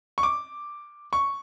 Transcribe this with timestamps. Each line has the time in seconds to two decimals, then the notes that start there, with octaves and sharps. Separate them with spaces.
0.18 C#6
0.23 D6
1.13 C#6